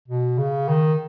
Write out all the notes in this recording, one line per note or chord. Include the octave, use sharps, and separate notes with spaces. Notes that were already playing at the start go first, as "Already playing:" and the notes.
B2
C#3
D#3